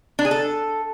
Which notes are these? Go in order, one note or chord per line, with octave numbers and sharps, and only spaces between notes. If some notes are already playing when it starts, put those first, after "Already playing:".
D4
G#4
A4